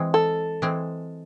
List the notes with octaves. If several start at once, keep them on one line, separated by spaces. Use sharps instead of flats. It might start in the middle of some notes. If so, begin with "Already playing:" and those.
Already playing: E3 G#3 C4
A4
E3 G#3 C4